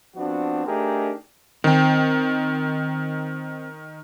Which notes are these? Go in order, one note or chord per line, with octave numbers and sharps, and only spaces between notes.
F3 B3 C4 D4 F#4
A3 D4 D#4 G4 G#4 A#4
D#3 C4 G5